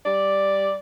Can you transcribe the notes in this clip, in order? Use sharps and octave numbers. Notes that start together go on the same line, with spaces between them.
G3 D5